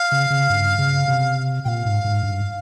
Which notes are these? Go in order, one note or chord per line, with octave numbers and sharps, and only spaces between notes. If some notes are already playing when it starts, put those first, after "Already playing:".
Already playing: F5
C#3
C#3
G2
C#3
C3
A#2 F5 G5
G#2
G#2
G2